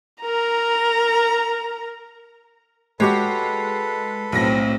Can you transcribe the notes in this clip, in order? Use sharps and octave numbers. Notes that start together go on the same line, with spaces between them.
A#4 A#5
G#3 F#4 G4 A4 B4 C#5
B1 A2 C4 A#6